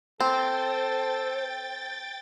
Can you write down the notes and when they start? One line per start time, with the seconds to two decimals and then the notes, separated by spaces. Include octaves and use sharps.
0.20 C4 A4 C5 G5 A6